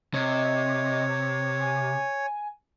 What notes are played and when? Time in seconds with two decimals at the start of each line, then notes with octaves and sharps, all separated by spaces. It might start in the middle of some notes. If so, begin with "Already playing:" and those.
0.14 C3 C#5 D#5
1.60 G#5